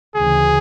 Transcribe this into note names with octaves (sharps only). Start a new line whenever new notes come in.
D2 C#3 E3 G#4